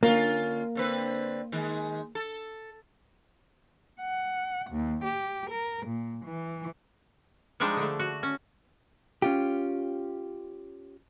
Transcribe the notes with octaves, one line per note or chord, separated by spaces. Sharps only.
D3 A#3 C#4 F4
D3 C4 B4
D#3 G#3
A4
F#5
D#2
G4
A#4
A#2
E3
F3 G3 G#3 D4 D#4
D3 A3
F#4
C#4
C#4 F4 G4